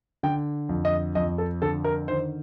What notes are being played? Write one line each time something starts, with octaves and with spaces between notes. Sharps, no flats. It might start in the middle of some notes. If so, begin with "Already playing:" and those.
D3 G5
F2
D#5
F2 D#5
A4
D3 A4
A#4
D#3 C5